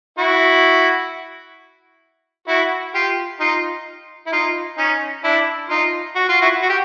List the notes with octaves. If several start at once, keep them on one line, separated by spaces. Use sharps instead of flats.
E4 F#4
E4 F#4
F4 G4
D#4 F4
E4
D#4 F4
C#4 D#4
D4 E4
D#4 F4
F#4
F4
E4 F#4
F#4
G4